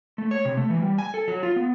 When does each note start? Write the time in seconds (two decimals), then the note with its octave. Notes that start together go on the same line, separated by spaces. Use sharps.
0.18 A3
0.31 C#5
0.45 C3
0.57 A3
0.70 E3
0.82 G3
0.98 G#5
1.14 A4
1.28 F#3
1.43 F4
1.56 B3